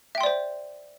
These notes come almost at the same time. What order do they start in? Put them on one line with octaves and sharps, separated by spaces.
E5 G5 C6 D5 C5